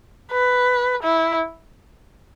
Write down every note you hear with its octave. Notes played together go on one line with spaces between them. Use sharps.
B4
E4